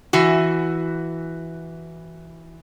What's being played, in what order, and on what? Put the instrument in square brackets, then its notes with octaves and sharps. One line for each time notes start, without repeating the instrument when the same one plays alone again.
[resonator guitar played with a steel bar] E3 F#4